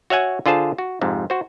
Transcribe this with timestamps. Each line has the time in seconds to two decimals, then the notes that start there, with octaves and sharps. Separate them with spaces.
0.10 F#4 C#5 E5 F#5 G#5
0.46 D3 F4 G#4 C5 A5
0.78 F#4
1.01 F2 G#2 C3
1.30 F#4 C5